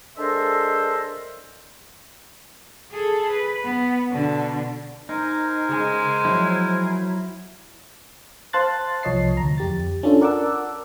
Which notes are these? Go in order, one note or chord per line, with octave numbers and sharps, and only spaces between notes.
G#3 D4 A4 A#4 C5 E5
G#4 A4
B4
B3
B2 D3
D#4 A#4 C5 G#5
C#3 G#3
F3 F#3 E4
C5 F5 A5 C6 F#6 A6
C2 F3 C#5 D#5 A5 C7
D2 A#5
F2 G4 A6
C#4 D4 F4 A4
A#4 D5 F#5 A5 D6 E6